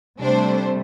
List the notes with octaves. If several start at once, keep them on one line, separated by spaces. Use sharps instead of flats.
C3 G3 A3 D4 C5